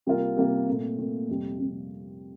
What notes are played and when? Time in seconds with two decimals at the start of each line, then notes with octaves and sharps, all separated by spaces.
0.06 C3 G3 A#3 F4 A#4
0.37 C3 G3 A#3 F4 A#4
0.68 A#2 A3 C4
0.99 A#2 A3 C4
1.28 F2 C3 G3 C4
1.59 F2 C3 G3 C4